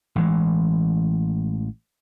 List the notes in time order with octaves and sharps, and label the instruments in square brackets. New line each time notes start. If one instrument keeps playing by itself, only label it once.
[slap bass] A1 E3 G#3